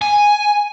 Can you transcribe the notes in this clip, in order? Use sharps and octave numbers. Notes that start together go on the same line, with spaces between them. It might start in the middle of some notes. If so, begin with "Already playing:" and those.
G#5